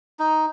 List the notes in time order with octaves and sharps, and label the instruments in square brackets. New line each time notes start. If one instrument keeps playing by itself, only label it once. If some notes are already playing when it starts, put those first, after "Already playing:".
[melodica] D#4